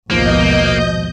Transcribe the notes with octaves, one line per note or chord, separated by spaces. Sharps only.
A#1 D#2 G#2 B2 F3 A#3 D#5 G6